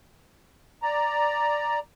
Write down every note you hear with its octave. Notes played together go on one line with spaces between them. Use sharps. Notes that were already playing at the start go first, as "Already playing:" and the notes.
D5 A#5